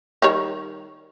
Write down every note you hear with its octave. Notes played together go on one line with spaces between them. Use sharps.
D#3 G3 C#5